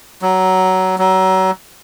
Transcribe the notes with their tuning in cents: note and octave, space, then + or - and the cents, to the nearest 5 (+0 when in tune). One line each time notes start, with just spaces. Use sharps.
F#3 +15
F#3 +30